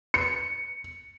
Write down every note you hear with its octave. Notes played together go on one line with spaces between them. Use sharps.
C#7